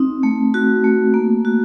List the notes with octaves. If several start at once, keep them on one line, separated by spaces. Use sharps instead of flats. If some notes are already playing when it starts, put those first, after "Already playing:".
Already playing: C4 D#4
A3
F#4
A3
A#3
F#4